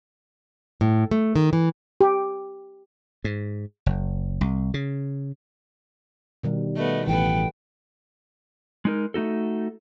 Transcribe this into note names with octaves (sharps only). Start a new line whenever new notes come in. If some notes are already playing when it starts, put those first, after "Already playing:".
A2
A3
D#3
E3
G4
G#2
F#1
C2
C#3
B2 D#3 G3
A3 B3 D#5
A1 E3 B3 A4 G5
G#3 D#4 A#4
A3 D#4 F#4 A4